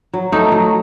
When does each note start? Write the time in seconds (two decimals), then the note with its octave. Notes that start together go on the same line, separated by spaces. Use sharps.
0.13 F#3
0.32 A3 D#4
0.52 F#3